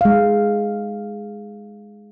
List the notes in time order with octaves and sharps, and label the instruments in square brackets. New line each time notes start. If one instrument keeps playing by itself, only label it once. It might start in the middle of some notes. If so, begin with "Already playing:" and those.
[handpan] G#3 F5